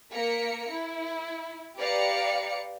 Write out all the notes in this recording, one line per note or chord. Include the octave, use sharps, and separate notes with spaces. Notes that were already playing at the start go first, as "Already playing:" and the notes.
A#3 A#4 B6 C#7
E4
G4 B4 D5 F5 A#5 C#7